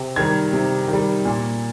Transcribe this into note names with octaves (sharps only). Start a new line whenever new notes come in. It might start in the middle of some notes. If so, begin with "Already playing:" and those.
Already playing: C3
D#3 G3 G#6
C3
D#3 G3
A#2